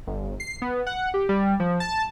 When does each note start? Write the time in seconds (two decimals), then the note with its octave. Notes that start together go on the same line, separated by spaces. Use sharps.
0.07 G1
0.40 C7
0.62 B3
0.87 F#5
1.14 G4
1.29 G3
1.60 F3
1.80 A5